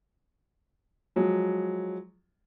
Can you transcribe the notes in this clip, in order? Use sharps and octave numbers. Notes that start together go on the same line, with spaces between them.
F3 F#3 G#3